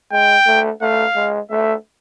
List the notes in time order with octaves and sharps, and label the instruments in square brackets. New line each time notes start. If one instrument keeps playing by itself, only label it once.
[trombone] G#3 [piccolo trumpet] G5
[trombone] A3
[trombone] A3 [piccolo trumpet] F5
[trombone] G#3
[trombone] A3 [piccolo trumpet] E5